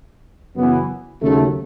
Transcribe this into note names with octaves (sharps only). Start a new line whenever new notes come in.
F#2 C#3 E3 B3
D#2 C#3 F#3 A3